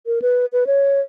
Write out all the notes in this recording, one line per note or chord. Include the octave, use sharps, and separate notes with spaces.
A#4
B4
B4
C#5